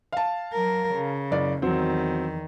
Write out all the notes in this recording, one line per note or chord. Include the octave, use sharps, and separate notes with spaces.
F5 A5
F#3 A#4
C#3
F#1 D5
E2 D#3 F#3 C4